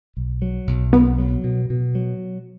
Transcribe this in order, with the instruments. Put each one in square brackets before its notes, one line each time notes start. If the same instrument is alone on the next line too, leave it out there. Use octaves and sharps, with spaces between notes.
[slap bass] B1
F#3
B1
[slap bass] B1 [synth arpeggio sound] B3
[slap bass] F#3
B2
B2
F#3